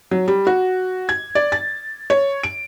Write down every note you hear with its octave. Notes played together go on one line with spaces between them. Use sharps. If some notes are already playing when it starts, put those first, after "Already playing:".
F#3
G3
F#4
G#6
D5
A6
C#5
D7